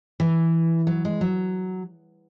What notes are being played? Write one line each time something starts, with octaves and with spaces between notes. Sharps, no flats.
E3
F#3
G#3
F#3